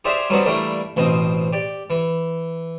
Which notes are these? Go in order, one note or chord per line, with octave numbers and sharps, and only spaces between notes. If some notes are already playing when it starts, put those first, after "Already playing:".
G4 G#4 C5 D5 E5 F5
F#3 G3 B3 C4 D4 F#4
E3 G3 A3 A#3 D4
A1 B2 C4 D#5
G4 D5
E3